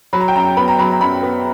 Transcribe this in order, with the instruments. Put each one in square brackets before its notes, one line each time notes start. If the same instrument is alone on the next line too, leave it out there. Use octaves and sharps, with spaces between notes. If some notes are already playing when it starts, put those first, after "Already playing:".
[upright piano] F#3 B5
A#5
G5
F#2 A#5
B3 B5
A#5
F#3 B5
A#5
F#2 B5
B3